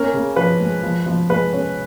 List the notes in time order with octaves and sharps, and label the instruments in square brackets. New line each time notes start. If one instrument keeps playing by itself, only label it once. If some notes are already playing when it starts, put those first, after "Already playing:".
Already playing: [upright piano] A#3 C#4 A#4
C#3
F3 B4
G#3
F3
F3
G#3 B4
C#4